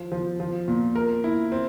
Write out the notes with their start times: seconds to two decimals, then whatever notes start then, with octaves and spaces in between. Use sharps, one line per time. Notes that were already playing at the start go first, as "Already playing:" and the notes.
Already playing: F3
0.12 F3
0.40 F3
0.68 A#2
0.96 A#4
1.24 E4
1.52 C4